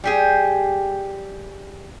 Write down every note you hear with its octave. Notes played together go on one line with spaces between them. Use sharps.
G3 G4 G#4